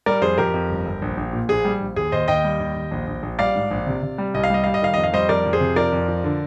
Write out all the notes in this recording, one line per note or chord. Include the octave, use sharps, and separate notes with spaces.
G3 A#4 D5
F2 G#4 C5
F2 G4 A#4
F2
G1
G1
A#1
A#1
A#2
A#1 G#4
G3
A#1
D#2 G#4
D#2 C5 D#5
D#2 D#5 G5
G3
D#2
D#2
A#1
A#1
A#1
G3 D5 F5
G#2
A#1
C3
C3
G3
C2 D#5
F5
G3 D#5
G3 F5
D#5
D#3 F5
F2 D#5
F5
G3 C5 D#5
F2 A#4 D5
F2
G#4 C5
C3
F3 A#4 D5
F2
F3
D3